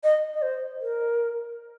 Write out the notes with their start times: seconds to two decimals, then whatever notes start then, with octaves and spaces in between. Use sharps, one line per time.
0.04 D#5
0.34 D#5
0.42 C5
0.81 A#4